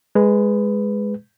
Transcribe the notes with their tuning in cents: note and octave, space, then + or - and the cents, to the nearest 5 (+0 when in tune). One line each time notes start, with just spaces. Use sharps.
G#3 +0 B4 +10